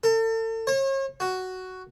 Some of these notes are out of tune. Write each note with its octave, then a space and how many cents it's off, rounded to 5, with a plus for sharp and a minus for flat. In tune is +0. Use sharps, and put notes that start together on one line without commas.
A4 +35
C#5 -40
F#4 +5